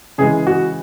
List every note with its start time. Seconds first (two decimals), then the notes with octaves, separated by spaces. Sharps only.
0.18 C#3 E3 G#3 G#4
0.47 F#4